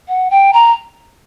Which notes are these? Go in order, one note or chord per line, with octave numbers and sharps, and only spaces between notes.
F#5
G5
A#5